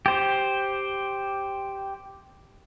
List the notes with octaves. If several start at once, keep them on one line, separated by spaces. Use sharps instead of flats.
G4 C5